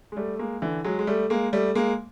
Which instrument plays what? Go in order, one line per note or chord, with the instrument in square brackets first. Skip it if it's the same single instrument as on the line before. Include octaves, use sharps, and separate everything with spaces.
[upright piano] G#3
G3 A3
A3
G#3 A#3
D3 E3
F#3 G#3
G#3
G3 A3
G#3 A#3
G3 A3
G#3 A#3